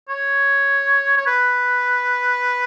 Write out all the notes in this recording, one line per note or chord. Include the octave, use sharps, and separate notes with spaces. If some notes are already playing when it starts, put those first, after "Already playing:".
C#5
C#5
B4